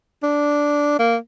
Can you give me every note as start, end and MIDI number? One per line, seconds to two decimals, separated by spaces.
0.23 0.97 62
0.99 1.16 58